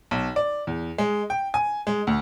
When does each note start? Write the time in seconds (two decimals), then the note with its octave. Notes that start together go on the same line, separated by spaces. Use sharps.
0.11 B1
0.36 D5
0.67 E2
0.98 G#3
1.30 G5
1.54 G#5
1.87 G#3
2.07 D2